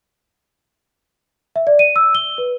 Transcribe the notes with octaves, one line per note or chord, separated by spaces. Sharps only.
E5
D5
D#7
E6
G7
B4